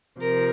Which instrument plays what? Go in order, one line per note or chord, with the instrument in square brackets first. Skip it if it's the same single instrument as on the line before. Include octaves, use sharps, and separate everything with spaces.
[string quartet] C3 F3 A#4